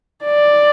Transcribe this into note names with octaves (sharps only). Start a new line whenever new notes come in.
D5